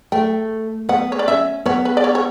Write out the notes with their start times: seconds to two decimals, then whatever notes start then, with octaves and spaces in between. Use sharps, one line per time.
0.12 A3 G5
0.89 B3 F#5
1.12 C#5
1.19 D5
1.28 C#4 E5
1.66 B3 C#5
1.85 B4
1.97 D5
2.04 C#5
2.15 C#5